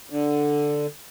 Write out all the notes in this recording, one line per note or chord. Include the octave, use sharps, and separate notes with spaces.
D3